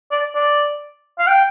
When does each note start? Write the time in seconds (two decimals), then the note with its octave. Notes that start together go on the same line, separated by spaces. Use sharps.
0.11 D5
0.35 D5
1.19 F5
1.27 G5